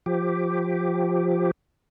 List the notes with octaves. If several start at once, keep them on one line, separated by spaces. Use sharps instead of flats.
F3 G4